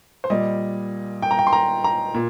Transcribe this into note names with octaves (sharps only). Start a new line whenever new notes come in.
C5
A#2 G3 D#5
G5
A#5
G5
C6
A#5
A#5
A#2